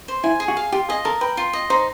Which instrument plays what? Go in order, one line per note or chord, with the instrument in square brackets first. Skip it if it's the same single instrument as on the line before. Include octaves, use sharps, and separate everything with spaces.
[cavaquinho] C5
[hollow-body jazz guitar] E4 [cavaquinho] G#5
[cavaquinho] G#4
[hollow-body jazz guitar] F#4
[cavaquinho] F5
[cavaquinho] F4 [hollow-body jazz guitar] G4
[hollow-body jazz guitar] G#4 [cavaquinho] D#5
[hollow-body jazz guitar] A4 [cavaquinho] A#4
[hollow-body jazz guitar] B4 [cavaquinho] G5
[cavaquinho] F4
D#5
[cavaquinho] D#4 [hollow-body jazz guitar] C5